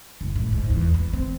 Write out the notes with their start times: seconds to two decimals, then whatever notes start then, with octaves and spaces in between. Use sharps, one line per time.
0.21 F#1
0.36 A2
0.53 G#2
0.70 E2
0.94 B3
1.13 C4